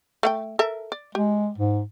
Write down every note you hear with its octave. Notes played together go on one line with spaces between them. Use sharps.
A3 F#5 G5
A4 A#4 E5
D5
G#3 G4
G#2